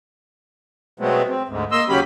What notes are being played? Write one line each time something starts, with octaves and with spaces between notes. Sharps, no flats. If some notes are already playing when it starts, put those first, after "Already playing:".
B2 F#3 G#3 A3 B3 C4
C4
D2 G#2
A#3 D#5 C6 E6
D#2 C#3 F#3 C#4 G4 B5